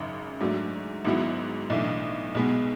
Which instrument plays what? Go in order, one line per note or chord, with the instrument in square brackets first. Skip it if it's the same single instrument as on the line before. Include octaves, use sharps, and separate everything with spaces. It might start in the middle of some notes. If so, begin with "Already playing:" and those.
Already playing: [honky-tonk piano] G#1 F#2 C#3
G#2 F#3 A3 D4
G#1 G#2 F#3 B3 E4
B1 A2 E3 A3 D4
B1 B2 G#3 B3